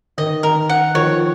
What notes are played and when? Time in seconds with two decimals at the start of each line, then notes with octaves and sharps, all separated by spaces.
0.18 D#3 D#5
0.43 D#3 A#4
0.69 F#5
0.94 D#3 F3 C#5